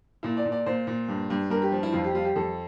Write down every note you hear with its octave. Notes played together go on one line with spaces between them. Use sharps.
A#2 E4
D5
A#2
D5
A#2 C5
A#2
G2
G2
G2 A#4
G4
F3
E4
F2 F4
G4
G3 F4
G4
F2 A4